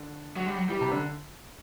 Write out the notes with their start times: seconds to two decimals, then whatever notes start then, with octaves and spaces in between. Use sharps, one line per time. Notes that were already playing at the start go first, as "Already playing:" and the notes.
Already playing: D3
0.36 F#3
0.46 G3
0.57 F#3
0.69 E3 G3
0.81 C3
0.91 D3